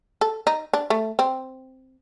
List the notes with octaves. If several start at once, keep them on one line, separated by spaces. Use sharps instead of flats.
A4
D#4
D4
A3
C4